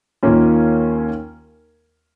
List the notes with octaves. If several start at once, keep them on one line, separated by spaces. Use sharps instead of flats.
D#2 D#3 A#3 C#4 F4